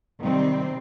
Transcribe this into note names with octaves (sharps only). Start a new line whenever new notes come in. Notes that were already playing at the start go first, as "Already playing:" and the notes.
C3 D#3 G3 C4